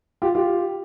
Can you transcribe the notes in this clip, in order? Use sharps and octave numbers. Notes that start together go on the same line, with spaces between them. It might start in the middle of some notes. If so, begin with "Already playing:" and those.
F4 G4
F4 G4